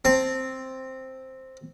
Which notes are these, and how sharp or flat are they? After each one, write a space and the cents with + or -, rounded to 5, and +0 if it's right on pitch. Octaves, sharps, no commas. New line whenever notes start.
C4 +0 A5 +0